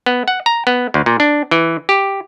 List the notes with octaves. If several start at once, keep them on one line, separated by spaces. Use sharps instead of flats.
B3
F#5
A#5
B3
D2
A#2
D4
E3
G4